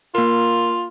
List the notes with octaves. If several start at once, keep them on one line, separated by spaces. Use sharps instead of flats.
A#3 F4 A#4